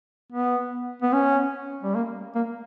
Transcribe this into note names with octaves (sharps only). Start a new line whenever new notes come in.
B3
B3
C#4
G3
A#3
A#3